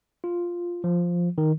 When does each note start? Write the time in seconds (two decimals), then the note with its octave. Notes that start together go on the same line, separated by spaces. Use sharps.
0.24 F4
0.84 F3
1.38 D#3